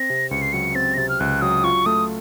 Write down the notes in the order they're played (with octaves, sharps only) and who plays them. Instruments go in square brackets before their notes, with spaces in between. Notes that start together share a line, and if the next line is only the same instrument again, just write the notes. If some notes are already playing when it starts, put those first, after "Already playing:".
Already playing: [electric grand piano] C4 [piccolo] A#6
[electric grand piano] C3
[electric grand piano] C#2 [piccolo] C#7
[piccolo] C7
[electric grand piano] F#3 [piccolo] C#7
[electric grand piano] C4 [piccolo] A6
[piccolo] A#6
[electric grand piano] C3 [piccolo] A6
[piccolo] F6
[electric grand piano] C#2 [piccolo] F#6
[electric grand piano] F#3 [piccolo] D#6
[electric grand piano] F4 [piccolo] C#6
[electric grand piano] A3 [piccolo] D#6